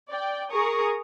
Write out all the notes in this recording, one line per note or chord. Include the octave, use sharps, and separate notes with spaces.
D5 G5
G#4 A#4 A#5 C#6 D#6